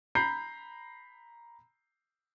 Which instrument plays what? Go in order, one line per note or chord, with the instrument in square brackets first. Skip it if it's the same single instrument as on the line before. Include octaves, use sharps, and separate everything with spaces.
[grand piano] A#5 B5 G6 C7